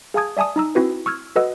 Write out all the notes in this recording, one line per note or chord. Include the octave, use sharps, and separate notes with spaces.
G#4 F5 G#5 A5 D#6 G#6
D5 E5 G#5 A5 D#6
D#4 A#5 E6
C4 E4 F#4 B4
C#6 E6 F6 G#6
F#4 A4 B4 D#5 F#5 E6